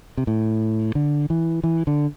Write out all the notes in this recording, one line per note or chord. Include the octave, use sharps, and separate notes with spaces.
C3
A2
D3
E3
E3
D3